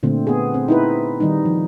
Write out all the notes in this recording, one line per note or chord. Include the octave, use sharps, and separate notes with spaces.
A#2 D3 A3 C4
B3 G#4
C4
D#4 E4 B4
D#3 G3 D#4
F3